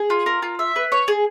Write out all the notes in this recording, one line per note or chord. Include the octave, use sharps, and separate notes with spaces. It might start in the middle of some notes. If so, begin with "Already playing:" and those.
Already playing: G#4
F4
A#4
F4
E5
B4
C#5
G#4